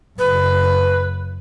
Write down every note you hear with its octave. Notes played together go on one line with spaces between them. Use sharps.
F#1 B4